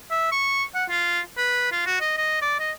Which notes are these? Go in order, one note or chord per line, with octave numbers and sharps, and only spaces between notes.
E5
C#6
F#5
F4
B4
F4
F#4
D#5
D#5
D5
D#5